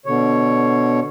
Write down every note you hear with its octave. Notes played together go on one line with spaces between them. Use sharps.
B2 D3 C#5